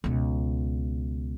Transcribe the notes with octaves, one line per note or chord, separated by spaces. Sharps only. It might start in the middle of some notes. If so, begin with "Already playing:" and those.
C#2 B2